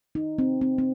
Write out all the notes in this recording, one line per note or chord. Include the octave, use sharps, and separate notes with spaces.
D#4
C4
C4
C4